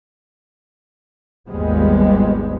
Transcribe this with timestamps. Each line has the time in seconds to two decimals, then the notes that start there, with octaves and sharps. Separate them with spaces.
1.48 G#1 D#2 F3 G3 G#3 B3